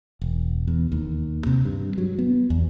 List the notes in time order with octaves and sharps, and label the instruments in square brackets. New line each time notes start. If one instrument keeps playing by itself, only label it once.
[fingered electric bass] E1
E2
D#2
C3
G2
F#3
B3
E2